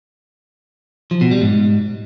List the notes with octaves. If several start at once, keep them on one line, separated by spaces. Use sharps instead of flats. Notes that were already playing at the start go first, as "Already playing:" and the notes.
F3
B2
G3
G#2